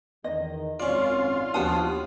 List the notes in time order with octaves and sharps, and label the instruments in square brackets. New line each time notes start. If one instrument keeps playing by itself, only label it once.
[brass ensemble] E2 D#3 [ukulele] D#5
[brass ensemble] G#1 F#2 [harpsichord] C#4 D5 [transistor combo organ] F4
[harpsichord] D#2 B3 D#6 [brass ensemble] F3 D4 G4 [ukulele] F#4 A5